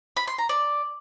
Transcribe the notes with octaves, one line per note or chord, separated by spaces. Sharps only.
B5
C6
A#5
D5